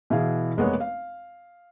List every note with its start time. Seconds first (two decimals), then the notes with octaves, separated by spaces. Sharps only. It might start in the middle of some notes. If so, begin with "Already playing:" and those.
0.10 B2 E3 E4 G#4 F5
0.57 F1 G#3 A#3 B3 C#5
0.80 F5